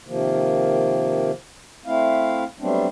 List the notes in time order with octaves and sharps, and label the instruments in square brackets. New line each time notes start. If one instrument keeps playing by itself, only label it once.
[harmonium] C3 D#3 F3 A#3
A3 C4 E4 F5
F#3 G3 A3 B3 C4 D4